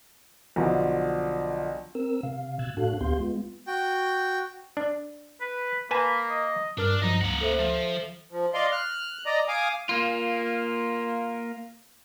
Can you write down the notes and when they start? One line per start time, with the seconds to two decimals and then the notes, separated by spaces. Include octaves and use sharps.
0.56 B1 D3 F3
1.95 C4 A#4 E6
2.23 C3 F5
2.59 B2 E6 F#6 G#6 A6
2.77 A2 D4 F#4 A4 F5 F#6
3.01 D2 B3 G4 F5 C6 G6
3.20 G#3 B3 F4
3.67 F#4 G5
4.77 D4
5.41 B4
5.91 A#3 B4 G#5 A5 B5
6.29 D#5
6.77 G2 D4 A#4 F6
7.02 G2 F3 F#3 D#5 A#5
7.21 C#2 A#3 F#5
7.41 A4 C5 E5
7.59 F3
8.31 F3
8.54 D5 D#5 F5 C6
8.72 F6 F#6
9.26 D5 D#5 A#5
9.48 F5 G#5 D6 D#6
9.89 A#3 F4